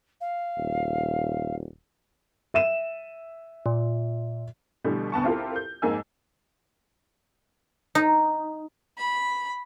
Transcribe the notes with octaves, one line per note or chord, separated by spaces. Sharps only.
F5
D#1
E5 D#7 E7
A#2
B2 D3 E3 G3 A3
D2 B3 A5 C#6
C4 E4 F4 G4 A4 A#4
G6
F2 G#2 A#3 G#5 E6
D#4
B5